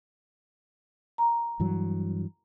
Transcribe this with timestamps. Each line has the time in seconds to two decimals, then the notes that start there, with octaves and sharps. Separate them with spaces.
1.18 A#5
1.60 G2 E3 F#3